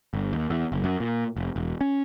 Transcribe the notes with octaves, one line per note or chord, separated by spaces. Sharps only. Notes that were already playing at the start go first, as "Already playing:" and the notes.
G1
D#2
E2
F#1
F#2
A#2
F1
E1
C#4